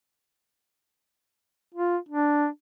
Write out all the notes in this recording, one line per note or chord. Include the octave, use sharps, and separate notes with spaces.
F4
D4